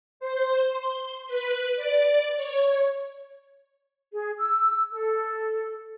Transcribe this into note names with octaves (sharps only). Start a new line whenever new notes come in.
C5
C6
B4
D5
C#5
G#4
E6
A4